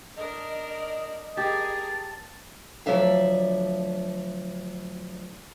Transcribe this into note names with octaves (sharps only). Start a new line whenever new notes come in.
D4 A#4 D#5
G4 G#4 A#4 A5
D2 F3 F#3 D5 E5 F5